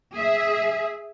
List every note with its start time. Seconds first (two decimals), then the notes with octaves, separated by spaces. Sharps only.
0.15 G#4 E5